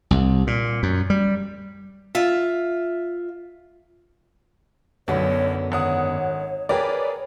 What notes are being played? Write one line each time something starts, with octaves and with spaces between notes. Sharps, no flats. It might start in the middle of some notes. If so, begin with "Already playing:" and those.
C2
A#2
F#2
G3
F4 E5
B1 F#2 D3 B3 C#5
G#1 C#5 F#5 D#6
G#4 A#4 B4 C#5 D5 G5 G#5